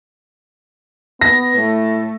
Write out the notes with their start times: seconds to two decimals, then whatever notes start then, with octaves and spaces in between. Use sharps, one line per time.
1.21 B3 A#6
1.56 A2 A3